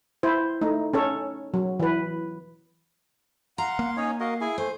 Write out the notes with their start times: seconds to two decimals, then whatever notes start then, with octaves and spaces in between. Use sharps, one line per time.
0.23 E4 C5
0.61 A3 D#4
0.94 C#4 A4 C#5
1.54 F#3
1.80 E3 B4
3.58 F5 F#5 A#5 C6
3.79 A#3
3.97 C#4 D#4 C#5 G#5
4.20 F#4 A#4 D#5 F5
4.41 E4 G#4 G#5
4.58 A3 C5 G#5